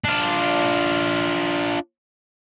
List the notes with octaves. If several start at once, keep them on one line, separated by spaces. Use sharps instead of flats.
D4 F4